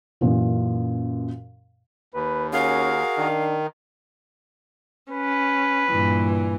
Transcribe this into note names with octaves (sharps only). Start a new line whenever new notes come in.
F#2 A#2 E3
D#2 B4
C#4 F#4 G#4 A#4 F5
D#3 D4
C#4 B4
G2 A#2 E3